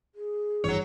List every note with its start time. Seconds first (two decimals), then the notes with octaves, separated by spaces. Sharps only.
0.15 G#4
0.64 G#1 G2 E3 F#3 C#5